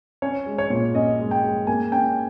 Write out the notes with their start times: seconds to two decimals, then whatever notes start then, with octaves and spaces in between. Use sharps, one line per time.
0.22 C#4 C#5
0.46 G#3
0.58 C#5
0.70 A#2
0.95 C#4 D#5
1.19 G#3
1.31 G5
1.43 G#3
1.67 A#3 G#5
1.92 C#4 G5